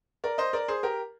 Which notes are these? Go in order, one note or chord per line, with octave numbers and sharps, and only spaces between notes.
A#4 D5
C5 D#5
A#4 D5
G#4 C5
G4 A#4